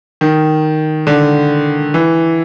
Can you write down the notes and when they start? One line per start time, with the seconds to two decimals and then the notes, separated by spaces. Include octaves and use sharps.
0.21 D#3
1.07 D3
1.94 E3